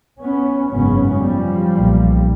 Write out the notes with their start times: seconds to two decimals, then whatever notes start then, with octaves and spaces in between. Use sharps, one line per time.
0.20 B3 C#4
0.72 G#1 F#2 C#3 B3 C#4
1.23 F3 G3
1.73 B1 A#2